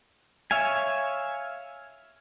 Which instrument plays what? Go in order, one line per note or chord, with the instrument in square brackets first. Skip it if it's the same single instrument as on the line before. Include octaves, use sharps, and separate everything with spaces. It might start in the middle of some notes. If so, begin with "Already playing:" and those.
[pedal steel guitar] C#5 E5 F5 G#5